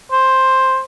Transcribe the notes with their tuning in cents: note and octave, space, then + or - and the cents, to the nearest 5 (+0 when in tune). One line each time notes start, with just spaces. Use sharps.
C5 +10